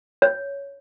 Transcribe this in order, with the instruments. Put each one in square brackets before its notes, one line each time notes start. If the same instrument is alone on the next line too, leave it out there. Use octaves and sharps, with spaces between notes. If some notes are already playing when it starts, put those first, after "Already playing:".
[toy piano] C#5